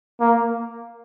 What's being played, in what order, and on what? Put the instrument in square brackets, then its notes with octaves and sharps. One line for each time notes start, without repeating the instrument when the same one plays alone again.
[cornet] A#3